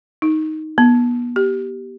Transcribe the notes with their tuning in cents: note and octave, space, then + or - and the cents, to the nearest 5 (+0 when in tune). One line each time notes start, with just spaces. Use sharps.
D#4 +5
B3 -35
G4 -10